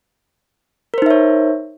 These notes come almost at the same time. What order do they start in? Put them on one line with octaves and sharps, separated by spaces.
A#4 C5 D#4 E5 C#5